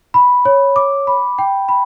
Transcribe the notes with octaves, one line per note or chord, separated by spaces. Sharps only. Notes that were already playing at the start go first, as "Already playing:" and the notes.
B5
C#5
D6
B5
G5
B5